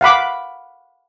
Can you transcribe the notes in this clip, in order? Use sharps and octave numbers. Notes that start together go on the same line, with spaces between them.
F5 F#5 B5 D6